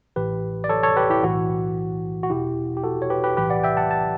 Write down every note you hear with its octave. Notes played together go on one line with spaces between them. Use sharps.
A1 A2 E3 G4 B4
D5
A4 C#5
A4 C#5
G4 B4
E4 G4
B1 A2 E3 F#4
F#4
E2 B2 E4 G4
G4
F#4 A4
C#5
G4 B4
G4 B4
B1 A2 E3 G4 B4
D5 F#5
E5 G5
F#5 A5
A5